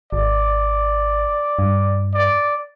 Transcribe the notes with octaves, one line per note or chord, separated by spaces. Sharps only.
G#1 D5
G2
D5